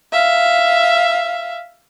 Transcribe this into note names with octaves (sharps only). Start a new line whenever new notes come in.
E5 F5